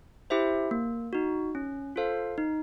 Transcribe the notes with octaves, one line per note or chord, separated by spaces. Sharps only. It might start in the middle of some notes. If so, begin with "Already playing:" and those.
E4 G4 C5 E5
A#3
D#4 F#4
C#4
F4 A4 C5 F5
D#4